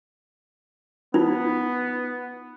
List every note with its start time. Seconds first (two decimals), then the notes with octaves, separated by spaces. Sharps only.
1.14 B3 D#4 F4